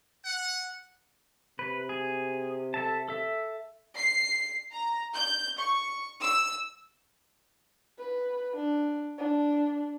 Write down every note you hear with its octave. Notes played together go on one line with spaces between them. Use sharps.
F#5
C3 B4
G#4
A4 E5 A5
A4 E5
C7
A#5
G6
C#6
E6
B4
D4
D4